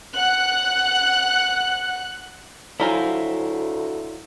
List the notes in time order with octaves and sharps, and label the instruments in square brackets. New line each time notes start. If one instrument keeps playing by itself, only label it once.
[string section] F#5 F#6
[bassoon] D2 [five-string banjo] F#3 F4 A#5 [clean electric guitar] E4 C5 G#5